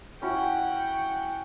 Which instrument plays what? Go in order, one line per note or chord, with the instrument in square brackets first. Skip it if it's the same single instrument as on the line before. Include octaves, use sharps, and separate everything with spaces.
[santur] C#4 E4 F#4 [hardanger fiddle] F#5 G5